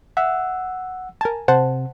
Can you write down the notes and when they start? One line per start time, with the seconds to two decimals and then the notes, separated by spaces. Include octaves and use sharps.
0.17 E5 F#5 E6
1.21 A#4 G#5 A5
1.48 C3 C5 F#5 A5